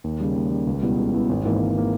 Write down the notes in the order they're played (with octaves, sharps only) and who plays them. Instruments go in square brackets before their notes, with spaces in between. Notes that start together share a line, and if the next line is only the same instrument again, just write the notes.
[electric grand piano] D#2
C#3 G3
D#2
C#3 G3
C#2
B2 G3 B3 E4
C#2
B2 G3 B3 E4
G#1
G#2 E3 A#3
G#1
E3 A#3